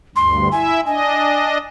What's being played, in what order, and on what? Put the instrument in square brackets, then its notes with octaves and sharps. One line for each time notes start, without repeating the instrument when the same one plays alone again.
[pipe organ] D2 G2 [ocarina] C6
[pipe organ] E4 E5 [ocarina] G#5
[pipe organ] D4 D#5 [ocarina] G#5